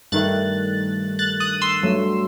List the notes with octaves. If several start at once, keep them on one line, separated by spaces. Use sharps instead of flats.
G2 D#3 A3 F#6 A6
F#6 A6
D#6 F#6
C6 E6
G2 F#3 A3